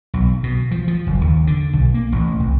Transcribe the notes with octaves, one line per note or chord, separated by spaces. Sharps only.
B1
B2
F3
F3
F#1
D#2
D3
B1
A#3
A1
C2